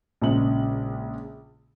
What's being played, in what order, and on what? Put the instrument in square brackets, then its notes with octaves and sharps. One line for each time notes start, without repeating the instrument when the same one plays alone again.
[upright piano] A#1 C#3 G#3 F#7